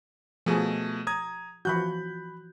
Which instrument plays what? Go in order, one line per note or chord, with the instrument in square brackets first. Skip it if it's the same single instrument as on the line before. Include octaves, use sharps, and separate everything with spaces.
[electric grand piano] B2 A3 [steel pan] F3 G#4
[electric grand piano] A#5 D#6 G#6
[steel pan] E3 F3 F#4 [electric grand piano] B5 F#6 G6